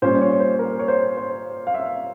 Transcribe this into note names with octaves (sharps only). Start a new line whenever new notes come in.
A#2 G3 C#4 C5
C#5
C5
A#4
C#5
C5
C5
F5
E5